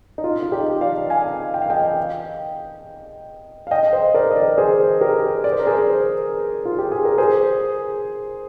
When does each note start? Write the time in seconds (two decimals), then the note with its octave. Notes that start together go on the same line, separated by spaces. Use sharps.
0.18 D#4
0.24 F4
0.42 F4
0.52 D#4 G4
0.81 D5 F5
1.10 F5 G#5
1.54 G5
1.62 F5
1.70 D#5 G5
3.67 F5
3.71 D#5 G5
3.93 C5 D#5
4.14 A#4 D5
4.31 D#5
4.36 A#4 D5
4.58 G#4 C5
5.01 G4 A#4
5.44 D5
5.52 C5
5.59 A#4
5.67 G#4 C5
6.65 F4
6.78 G4
6.92 G#4
7.05 A#4
7.18 G#4 C5